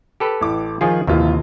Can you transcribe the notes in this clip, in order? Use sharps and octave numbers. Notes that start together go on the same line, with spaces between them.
G4 A4 B4
A1 D6
D#3 F3 F4 G#4
A#1 D#2 C3 E3 F4